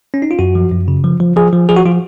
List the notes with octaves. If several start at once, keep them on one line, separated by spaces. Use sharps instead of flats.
C#4
D#4
F4
F#2 F#4
F3
F#2
C#3
F3
F3
F3 G#4
F3
F3 G#4
F#4
F3 F4